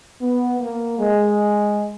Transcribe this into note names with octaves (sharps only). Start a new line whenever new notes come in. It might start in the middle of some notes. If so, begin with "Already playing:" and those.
B3
A#3
G#3